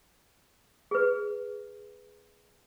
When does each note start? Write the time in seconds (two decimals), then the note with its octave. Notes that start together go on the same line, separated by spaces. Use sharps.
0.91 G#4 B4